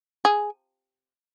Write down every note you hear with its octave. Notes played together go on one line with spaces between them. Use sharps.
G#4